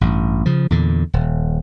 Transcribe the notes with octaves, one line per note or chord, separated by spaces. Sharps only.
A1 G2
C#3 F3
E2 A#2 D3
D#1